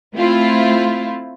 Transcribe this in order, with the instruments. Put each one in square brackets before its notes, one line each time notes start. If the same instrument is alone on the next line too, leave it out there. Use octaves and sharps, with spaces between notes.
[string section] A3 C4 E4 F4